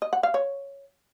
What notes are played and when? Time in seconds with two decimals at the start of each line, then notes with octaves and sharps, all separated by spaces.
0.02 D#5
0.13 F#5
0.23 F5
0.34 C#5